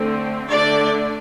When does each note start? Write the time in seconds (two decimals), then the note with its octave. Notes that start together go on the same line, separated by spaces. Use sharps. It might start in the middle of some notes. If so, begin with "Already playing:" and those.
Already playing: D3 A3 C4
0.51 D3 A3 D4 D5